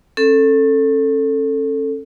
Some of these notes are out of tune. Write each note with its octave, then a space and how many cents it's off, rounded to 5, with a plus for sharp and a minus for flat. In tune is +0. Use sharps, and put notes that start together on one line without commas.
C#4 -35 A4 +10